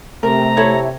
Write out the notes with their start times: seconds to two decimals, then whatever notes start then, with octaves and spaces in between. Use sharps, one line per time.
0.23 C3 A3 A#4 A#5
0.57 E4 A4 C#5